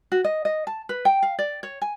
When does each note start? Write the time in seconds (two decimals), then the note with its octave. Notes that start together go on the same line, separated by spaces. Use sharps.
0.12 F#4
0.24 D#5
0.45 D#5
0.67 A5
0.89 B4
1.05 G5
1.23 F5
1.39 D5
1.63 C#5
1.82 G#5